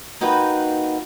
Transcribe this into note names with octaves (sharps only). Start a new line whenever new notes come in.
A#3 D#4 F#4 B4 G5